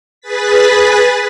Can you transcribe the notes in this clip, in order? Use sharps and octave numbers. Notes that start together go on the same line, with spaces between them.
G#4 B4 A6 B6